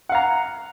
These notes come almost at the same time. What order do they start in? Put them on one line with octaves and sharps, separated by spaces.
F#5 F5 A#5